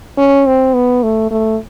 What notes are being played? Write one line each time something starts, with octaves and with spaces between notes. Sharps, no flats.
C#4
C4
B3
A3
A3